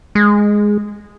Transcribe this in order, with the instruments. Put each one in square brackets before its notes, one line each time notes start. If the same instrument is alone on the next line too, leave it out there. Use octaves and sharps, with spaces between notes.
[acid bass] G#3